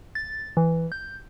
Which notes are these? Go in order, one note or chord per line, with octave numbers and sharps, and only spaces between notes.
A6
E3
G6